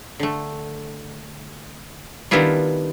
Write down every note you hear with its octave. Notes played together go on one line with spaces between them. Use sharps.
D3 A3
D#3 G3 B3 D4 E4 F4